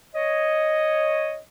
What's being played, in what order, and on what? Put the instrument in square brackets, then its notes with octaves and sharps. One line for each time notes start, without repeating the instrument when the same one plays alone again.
[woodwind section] C#5 D#5